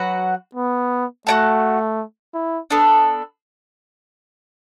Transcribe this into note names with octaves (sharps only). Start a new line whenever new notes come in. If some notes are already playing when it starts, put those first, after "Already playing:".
Already playing: F#3 F#4 B4 F#5
B3
A3 F#4 D5 F#5 A5
E4
B3 D4 A4